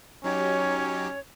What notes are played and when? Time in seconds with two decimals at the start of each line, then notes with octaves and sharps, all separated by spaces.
0.24 F#3 C#4 D#4 G4 C#5